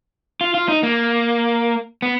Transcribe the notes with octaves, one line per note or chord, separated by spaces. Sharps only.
F4
F4
D#4
A#3
B3